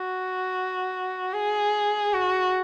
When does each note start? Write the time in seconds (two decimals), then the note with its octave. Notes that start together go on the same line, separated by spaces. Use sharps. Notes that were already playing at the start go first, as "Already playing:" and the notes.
Already playing: F#4
1.34 G#4
2.13 F#4